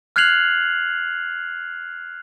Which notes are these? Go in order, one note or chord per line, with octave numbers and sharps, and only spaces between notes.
F6 F#6 G#6 C7 F7 F#7